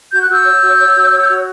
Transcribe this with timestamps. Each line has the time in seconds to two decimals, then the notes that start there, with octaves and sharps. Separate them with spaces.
0.12 F#4 G6
0.22 F#6
0.28 F#4 E6 G6
0.45 C#5
0.61 F#4
0.78 C#5
0.95 F#4
1.12 C#5
1.28 F#4